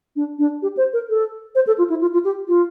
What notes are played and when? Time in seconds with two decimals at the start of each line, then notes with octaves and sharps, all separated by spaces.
0.16 D4
0.39 D4
0.62 G4
0.77 C5
0.93 A#4
1.09 A4
1.55 C5
1.67 A4
1.78 F4
1.90 E4
2.01 F4
2.13 F4
2.25 G4
2.48 F4